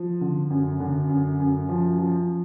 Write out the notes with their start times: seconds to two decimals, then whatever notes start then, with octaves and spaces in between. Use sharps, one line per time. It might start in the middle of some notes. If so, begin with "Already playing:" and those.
Already playing: F3
0.21 D3
0.50 F#2
0.80 D3
1.09 F#2
1.40 F#2
1.69 F3
1.98 F3